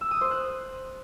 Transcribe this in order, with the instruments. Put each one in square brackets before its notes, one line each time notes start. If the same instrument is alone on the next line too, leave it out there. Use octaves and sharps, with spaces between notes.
[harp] E6
D#6
C5
F#6